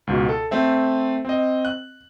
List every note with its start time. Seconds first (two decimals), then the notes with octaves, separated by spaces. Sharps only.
0.07 C#2 G#2 B2
0.29 A4
0.51 A3 C4 E5
1.25 C4 D#5
1.65 F#6